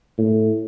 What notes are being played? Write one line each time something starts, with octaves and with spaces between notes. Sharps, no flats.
A2